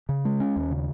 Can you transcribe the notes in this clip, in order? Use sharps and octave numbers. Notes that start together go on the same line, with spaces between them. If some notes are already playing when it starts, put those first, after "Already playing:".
C#3
G#3
C#4
D#2
C#3